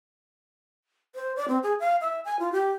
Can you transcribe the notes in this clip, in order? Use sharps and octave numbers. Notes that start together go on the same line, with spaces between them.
C5
D5
C4
G#4
F5
E5
G#5
F4
G4